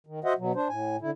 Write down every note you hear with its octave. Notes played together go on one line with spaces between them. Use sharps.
D#3
F#4 C5 D#5 E5 F#5
B2 F#3
D4 C5
A2 G#5
D3 E4